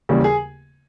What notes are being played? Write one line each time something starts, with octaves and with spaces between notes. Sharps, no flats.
D#2 C#3 E3 G3
G#4